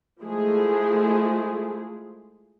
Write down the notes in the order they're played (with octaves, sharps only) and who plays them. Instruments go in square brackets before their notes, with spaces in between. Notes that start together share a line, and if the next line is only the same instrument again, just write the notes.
[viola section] F3 G#3 A3 E4 G#4